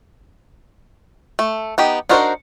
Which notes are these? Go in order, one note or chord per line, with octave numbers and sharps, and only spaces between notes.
A3
B3 D#4 G4
D4 D#4 F#4 A#4 C5